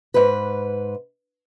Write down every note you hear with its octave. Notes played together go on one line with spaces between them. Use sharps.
G#2 B4